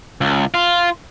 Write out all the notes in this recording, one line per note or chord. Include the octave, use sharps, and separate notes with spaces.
C#2
F4